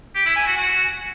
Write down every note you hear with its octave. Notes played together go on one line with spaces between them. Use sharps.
G4
E4
G#5
F#4
F#4